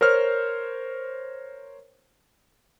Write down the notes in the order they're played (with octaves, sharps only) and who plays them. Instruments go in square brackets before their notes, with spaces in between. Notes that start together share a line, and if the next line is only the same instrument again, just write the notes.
[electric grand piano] A#4 C5 C#5 F6